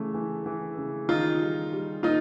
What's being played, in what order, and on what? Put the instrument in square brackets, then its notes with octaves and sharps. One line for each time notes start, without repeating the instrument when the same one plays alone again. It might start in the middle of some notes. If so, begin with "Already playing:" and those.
Already playing: [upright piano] C#3 E3 A3
E3
E3
C#3
[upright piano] D#3 [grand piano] D#4 F4
[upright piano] G3
G3
[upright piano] A#3 [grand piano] D#4 F4